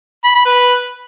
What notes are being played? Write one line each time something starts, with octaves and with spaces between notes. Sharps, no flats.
B5
B5
B4